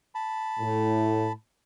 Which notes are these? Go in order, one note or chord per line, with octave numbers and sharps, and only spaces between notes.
A5 B5
A2